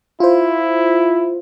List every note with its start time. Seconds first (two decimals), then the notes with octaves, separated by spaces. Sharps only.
0.20 E4 F4 C5